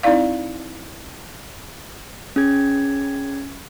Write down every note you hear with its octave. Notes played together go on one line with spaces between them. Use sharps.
C4 D#4 E4 D5 F5
C#4 G#4 G#6